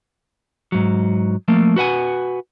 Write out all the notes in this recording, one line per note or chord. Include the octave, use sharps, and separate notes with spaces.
G#2 F#3
F3 A3 A#3
F#4 B4 F#5 G#5